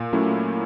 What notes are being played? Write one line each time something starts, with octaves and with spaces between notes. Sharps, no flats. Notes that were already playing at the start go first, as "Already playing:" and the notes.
Already playing: A#2
F#3 A3 C#4 E4